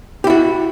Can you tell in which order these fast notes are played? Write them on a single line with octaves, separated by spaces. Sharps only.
G4 E4 F#4